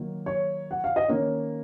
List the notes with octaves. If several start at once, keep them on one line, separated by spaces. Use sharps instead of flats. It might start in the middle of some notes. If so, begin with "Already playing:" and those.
Already playing: D#3 F#3 A#3
C#5
F#5
F5
D#5
D#3 A#3 C#4 C#5